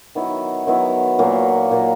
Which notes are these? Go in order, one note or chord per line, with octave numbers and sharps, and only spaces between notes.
D#3 F#3 B3 E4
D#3 F#3 B3 E4
A#2 F#3 A#3
A#2 F#3 A#3